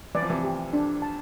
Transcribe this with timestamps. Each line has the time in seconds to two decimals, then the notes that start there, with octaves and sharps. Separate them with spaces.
0.15 E3 D5
0.22 F3
0.30 C3 E3
0.44 G4
0.73 D4
1.02 A5